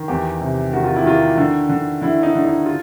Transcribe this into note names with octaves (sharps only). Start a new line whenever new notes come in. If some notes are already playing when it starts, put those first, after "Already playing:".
Already playing: D#3
E2 G4
C3
D#3 F#4
F4
E4
D#3 F4
D3
D3
D3 E4
D#4
D3
D#4
F4